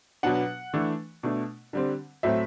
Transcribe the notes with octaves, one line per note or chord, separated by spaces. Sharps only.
B2 F#3 B3 D4 F#5
E3 A3 D4
B2 A3 D4
D3 G3 C4
A2 F#3 A3 C4 E5